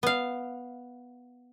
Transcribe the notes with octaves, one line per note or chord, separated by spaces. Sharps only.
B3 F5